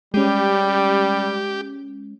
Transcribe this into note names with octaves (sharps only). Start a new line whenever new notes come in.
G3 G#3 C#4 G4